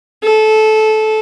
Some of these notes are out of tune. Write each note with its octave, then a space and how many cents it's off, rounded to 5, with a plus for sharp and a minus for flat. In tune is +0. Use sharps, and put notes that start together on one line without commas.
A4 -20